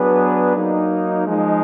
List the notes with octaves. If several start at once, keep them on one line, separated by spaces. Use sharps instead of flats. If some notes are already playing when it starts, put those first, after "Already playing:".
Already playing: F#3 B3 D4 G#4 B4
F#3 A#3 D#4
F3 G#3 D#4